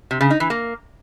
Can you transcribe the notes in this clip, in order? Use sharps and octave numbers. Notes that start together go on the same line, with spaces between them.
C3
C#3
D#4
E3
A#3